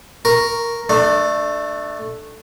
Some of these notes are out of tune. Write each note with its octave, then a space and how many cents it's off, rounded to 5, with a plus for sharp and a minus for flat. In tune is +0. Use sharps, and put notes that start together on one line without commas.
A#4 +0 C#6 +0
A3 +0 D4 +25